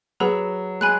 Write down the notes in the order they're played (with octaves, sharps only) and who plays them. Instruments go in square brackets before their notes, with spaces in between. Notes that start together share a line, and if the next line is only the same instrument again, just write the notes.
[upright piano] F#3 [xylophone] G#4 B4 F#5 B5 E6
[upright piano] G#3 [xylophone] G#5 B5 F#6